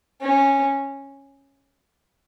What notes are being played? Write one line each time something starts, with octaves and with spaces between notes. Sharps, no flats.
C#4